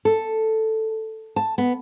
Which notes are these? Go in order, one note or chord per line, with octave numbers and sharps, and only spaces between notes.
A4
A5
B3